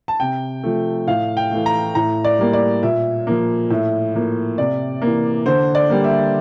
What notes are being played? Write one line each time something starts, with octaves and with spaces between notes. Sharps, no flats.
A5
C3 G5
F3 A3
A2 F5
G5
E3 A3
A#5
A2 A#5
D5
G3 A#3
D5
A#2 E5
F3 A#3
A2 E5
F3 A#3
C3 D5
E3 A#3
D3 C5
D5
G3 A#3
E5